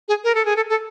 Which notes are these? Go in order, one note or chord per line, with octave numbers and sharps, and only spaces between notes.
G#4
A#4
A4
G#4
A4
A4